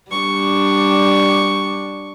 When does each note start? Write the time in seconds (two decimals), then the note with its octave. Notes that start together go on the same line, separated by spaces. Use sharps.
0.11 G3 D4 C#6